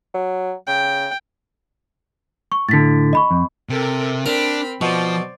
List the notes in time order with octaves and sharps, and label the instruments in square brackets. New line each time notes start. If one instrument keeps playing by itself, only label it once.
[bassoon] F#3
[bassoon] C#3 [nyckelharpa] G5
[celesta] C#6
[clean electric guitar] A2 D3 [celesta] A6 B6
[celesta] D#5 B5 C#6
[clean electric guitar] F2
[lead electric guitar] C3 [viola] A4 A#4
[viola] C4 B5 [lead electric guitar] D4 [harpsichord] A#4
[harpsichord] B2 [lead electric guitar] F3 [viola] C5 D5